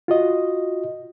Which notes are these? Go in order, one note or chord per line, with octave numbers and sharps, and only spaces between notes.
F4 F#4 D#5